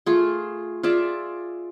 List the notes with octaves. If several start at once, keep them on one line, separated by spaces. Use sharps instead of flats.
A3 F4 G#4
F4 G#4 D5 E5